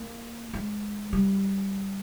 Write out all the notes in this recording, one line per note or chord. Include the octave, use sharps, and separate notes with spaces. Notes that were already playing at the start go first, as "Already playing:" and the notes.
Already playing: A#3
G#3
G3